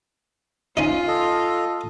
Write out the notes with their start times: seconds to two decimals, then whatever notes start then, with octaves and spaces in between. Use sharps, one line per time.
0.77 C#4 D#4 F4
1.08 A4 D#5